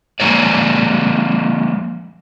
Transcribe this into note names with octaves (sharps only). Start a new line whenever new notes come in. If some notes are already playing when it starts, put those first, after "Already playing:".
F3 G#3 A#3 C#5 D5